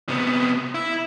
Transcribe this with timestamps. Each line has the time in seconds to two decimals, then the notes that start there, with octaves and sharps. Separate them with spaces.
0.09 C3 B3
0.75 E4